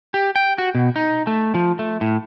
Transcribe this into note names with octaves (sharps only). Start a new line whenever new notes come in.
G4
G5
F#4
B2
D#4
A3
F3
A3
A2